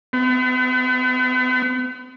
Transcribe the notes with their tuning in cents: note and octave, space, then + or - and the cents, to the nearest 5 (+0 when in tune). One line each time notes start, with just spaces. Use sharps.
B3 +45